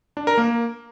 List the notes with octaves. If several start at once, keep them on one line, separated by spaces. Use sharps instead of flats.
D4
A#4
A#3